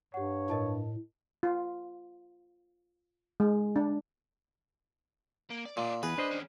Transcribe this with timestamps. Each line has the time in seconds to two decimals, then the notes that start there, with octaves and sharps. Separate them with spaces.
0.14 G2 G4 C#5 F#5
0.50 A2 A#4 D#5 A5
1.43 F4
3.40 G#3
3.76 D4
5.50 A#3
5.65 D5
5.77 A#2 D#4 D5
6.03 E2 G#4 B4
6.18 D4 C5 D#5
6.31 D#3 C#4